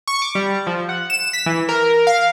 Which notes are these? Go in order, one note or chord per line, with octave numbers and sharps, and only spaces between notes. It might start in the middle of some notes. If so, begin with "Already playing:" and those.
C#6
D6
G3
F3
F#5
E7
B6
E3
A#4
F5